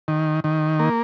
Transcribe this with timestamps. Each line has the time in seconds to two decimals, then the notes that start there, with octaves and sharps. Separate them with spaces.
0.08 D#3
0.44 D#3
0.79 A#3